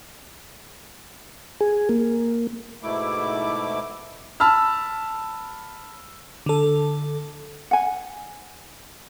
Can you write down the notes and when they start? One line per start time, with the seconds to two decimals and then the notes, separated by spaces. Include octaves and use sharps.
1.61 G#4
1.89 A#3
2.83 G#2 B2 A3 E4 D6
4.40 A5 B5 E6 F6
6.46 D3 A4
7.71 F#5 G#5